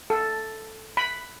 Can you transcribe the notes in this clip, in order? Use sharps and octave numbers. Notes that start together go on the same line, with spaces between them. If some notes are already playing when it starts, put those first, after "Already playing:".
A4
B5